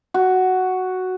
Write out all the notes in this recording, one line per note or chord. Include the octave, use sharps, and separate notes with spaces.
F#4